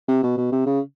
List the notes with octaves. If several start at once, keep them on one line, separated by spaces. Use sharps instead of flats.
C3
B2
B2
C3
C#3